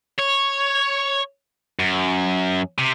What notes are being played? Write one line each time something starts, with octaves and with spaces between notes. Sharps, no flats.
C#5
F#2
C3